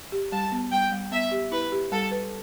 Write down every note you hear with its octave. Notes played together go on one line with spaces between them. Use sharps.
G4
G3 A5
B3
G3 G5
G3
B3 E5
G4
E4 B4
G4
G3 A4
B4